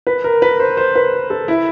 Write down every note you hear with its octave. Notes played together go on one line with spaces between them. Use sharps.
B4
A#4
B4
C5
C5
B4
A4
E4